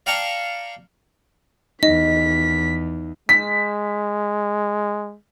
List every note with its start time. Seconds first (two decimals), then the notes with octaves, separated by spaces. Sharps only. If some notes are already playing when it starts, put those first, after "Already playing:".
0.06 D5 F5 G5 A5 A#5 C#6
1.83 E2 D#4 D#5 B6
3.29 G#3 B6